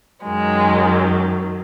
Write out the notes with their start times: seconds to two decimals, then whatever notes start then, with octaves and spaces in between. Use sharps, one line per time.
0.24 F#2 D#3 F#3 G#3